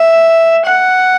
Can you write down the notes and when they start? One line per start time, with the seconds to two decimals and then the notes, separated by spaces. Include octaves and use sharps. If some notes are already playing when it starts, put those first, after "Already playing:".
Already playing: E5
0.65 F#5